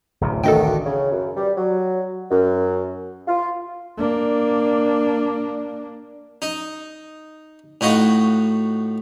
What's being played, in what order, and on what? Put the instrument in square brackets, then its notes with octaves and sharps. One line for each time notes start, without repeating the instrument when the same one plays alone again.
[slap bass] D1 A1 C3
[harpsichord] D#3 B3 [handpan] A3 D4 F#4 [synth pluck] A4 D#5 G5
[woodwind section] C#3
F#2
G3
F#3
F#2
F4
[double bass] A#3 D4
[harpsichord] D#4
A2 D#4 F4 F#4